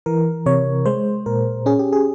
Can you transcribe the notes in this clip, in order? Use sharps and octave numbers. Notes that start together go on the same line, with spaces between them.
E3 A#4
C3 C#5
G#3 C5
A#2 A#4
C#4 G#4
G4
G#4